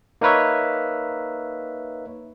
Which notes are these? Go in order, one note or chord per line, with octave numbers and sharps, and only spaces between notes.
A#3 D#4 A#4 B4 C#5 E5